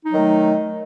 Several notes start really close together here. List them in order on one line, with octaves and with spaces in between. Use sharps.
D#4 F#3 D#3 A3